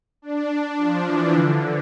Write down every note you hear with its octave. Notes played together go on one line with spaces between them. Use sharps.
D4
D4
F3
E3
D3